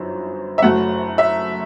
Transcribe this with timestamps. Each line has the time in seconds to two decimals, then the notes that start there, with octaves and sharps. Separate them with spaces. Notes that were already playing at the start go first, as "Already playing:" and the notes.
Already playing: G1 F#2 F#3 C4 D#4
0.58 E5
0.62 F#1 F#2 F#3 A3 F#5
1.18 E5